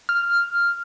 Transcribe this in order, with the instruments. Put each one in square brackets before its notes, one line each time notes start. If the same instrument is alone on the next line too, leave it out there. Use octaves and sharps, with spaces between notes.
[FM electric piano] F6